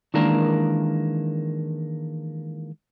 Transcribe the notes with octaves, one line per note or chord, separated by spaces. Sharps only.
D#3 E3 G#3 A#3 D4 A#4